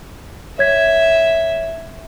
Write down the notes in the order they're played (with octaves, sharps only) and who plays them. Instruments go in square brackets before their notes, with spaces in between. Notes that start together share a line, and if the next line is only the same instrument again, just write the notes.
[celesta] C#5 G#6 B6 [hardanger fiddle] E5